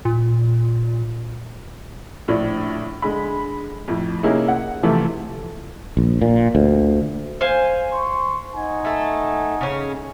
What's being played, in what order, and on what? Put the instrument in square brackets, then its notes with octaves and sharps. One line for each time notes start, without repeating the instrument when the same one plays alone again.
[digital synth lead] A#2
[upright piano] A#1 A2 D4
D3 G#3 B5
F2 A2
C3 A#3 C#4 D#4 E4 G#4
F#5
C3 E3 F3 A3
[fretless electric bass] A#1
A#2
D2
[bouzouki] C5 F5 G#5
[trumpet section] C6 C#6
D#4 F#5 G#5
[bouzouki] A3 A4
C#3 C#4